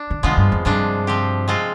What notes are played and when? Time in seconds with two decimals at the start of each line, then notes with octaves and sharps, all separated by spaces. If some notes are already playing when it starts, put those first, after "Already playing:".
Already playing: D4
0.10 D3
0.23 D3 F3 G#3 B3 F4
0.37 G2
0.52 F2
0.65 G2 C3 F3 G#3 D4
1.07 F3 C4 G4
1.48 G#3 C4 F4